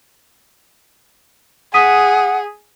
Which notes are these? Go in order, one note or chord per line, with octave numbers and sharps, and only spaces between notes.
G#4 F#5 D#6 B6 D#7